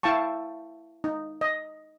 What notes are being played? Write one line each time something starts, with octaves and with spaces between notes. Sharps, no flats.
E4 F5 G5 A5 C#6
D#4
D#5